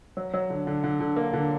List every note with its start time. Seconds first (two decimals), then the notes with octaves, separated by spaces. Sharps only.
0.17 F#3
0.33 F#3
0.50 D3
0.67 D3
0.83 D3
1.00 D3
1.16 A#3
1.33 D3